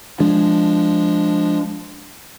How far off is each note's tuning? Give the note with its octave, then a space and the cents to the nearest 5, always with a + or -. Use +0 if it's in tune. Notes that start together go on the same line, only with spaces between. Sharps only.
F3 +0 G#3 +0 D4 +0